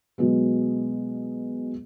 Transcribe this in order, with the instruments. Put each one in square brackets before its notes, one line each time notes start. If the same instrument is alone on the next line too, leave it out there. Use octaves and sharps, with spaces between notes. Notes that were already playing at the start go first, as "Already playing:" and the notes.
[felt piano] B2 F#3 G#3 B3